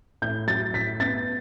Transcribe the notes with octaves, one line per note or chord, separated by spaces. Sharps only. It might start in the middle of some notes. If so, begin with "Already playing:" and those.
A2 G6
F#3 A6
A2 B6
B3 A6